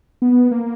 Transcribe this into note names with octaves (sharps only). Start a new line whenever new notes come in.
B3
A#3